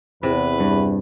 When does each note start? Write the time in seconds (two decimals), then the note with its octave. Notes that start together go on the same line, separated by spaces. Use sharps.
0.23 E2 C3 B4
0.60 G2